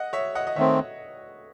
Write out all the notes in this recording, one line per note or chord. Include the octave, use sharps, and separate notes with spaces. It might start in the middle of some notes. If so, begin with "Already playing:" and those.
Already playing: D#5 F#5
C#5 E5
D#5 F#5
D#5
D#3 A3 C4 C#5 E5